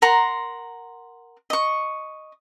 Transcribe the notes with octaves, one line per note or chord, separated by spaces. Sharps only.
A#4 F#5 A#5 C6
D#5 C#6